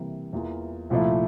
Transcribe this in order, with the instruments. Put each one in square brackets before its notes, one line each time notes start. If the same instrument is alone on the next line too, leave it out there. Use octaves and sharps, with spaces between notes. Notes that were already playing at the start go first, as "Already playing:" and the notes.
Already playing: [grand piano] C3 E3 G3 A#3
E2 E3 A#3 F4
C2 A#2 F3 A3 E4